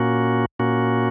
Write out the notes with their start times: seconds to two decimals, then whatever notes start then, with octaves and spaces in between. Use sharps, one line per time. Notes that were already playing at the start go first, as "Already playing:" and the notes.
Already playing: A#2 A#3 C#4 F#4
0.59 A#2 A#3 C#4 F#4